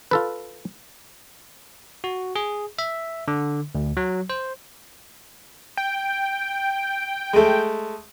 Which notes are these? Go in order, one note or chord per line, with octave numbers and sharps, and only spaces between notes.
F4 A4 B4
F#4
G#4
E5
D3
D2
F#3
C5
G5
G#3 A3